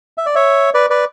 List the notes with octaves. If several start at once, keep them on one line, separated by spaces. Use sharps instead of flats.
E5
D5
C#5 E5
B4 D5
B4 D5